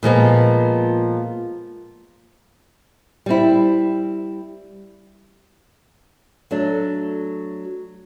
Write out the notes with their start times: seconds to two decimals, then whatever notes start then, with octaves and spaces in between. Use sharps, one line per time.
0.03 A#2 F3 G#3 B3
3.26 G3 C4 E4
6.51 F#3 A3 D4